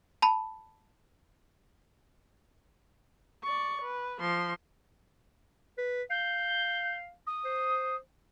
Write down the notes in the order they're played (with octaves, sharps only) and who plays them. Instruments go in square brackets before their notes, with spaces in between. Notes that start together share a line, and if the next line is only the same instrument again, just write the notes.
[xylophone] A5 B5
[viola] D5 C#6
B4
F3 C6
[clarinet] B4
[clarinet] F5 [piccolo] G6
[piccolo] D#6
[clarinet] C5